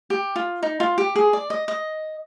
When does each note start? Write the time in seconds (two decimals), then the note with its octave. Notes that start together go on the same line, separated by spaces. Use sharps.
0.10 G4
0.36 F4
0.63 D#4
0.80 F4
0.98 G4
1.16 G#4
1.33 D5
1.50 D#5
1.68 D#5